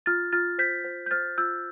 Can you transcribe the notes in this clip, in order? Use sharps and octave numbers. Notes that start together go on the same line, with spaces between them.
F4 F6 A6
F4 F6 A6
C5 G6 B6
C5
G6
C5 F6 A6
F4 E6 G6